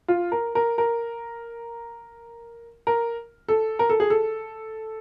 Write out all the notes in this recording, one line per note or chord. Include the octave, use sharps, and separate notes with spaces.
F4
A#4
A#4
A#4
A#4
A4
A#4
A4
G#4
A4